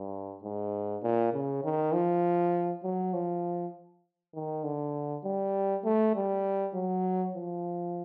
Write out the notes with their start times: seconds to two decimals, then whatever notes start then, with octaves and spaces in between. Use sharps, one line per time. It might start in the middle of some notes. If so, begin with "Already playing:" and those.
Already playing: G2
0.43 G#2
1.03 A#2
1.34 C#3
1.64 D#3
1.93 F3
2.84 F#3
3.14 F3
4.35 D#3
4.64 D3
5.24 G3
5.85 A3
6.15 G3
6.75 F#3
7.35 F3